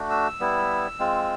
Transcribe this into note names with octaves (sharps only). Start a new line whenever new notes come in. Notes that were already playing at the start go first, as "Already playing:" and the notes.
Already playing: A3 D4 F#4
E6
G3 B3 E4
G#3 C4 F4